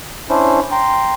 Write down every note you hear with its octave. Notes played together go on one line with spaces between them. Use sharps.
C#4 D4 E4 C5
G5 A#5 C6